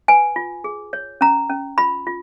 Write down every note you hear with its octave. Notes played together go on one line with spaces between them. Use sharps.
B4 G#5
F4
G#4
C#5
C#4 A#5
C#4
F4 B5
F4